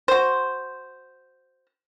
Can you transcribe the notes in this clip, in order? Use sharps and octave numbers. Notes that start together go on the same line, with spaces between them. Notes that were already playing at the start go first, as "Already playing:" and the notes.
F#4 C5